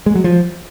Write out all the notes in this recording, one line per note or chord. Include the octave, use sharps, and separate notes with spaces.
G#3
F#3
F3